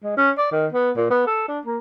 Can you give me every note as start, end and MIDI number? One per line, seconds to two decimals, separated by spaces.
0.03 0.13 56
0.17 0.31 61
0.38 0.49 74
0.52 0.66 51
0.72 0.91 59
0.96 1.06 46
1.10 1.24 59
1.26 1.48 69
1.48 1.59 62
1.66 1.79 58